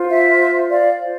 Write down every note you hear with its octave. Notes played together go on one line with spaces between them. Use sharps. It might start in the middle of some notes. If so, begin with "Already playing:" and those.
Already playing: F4 C5
E5
D5 F5
F4 C5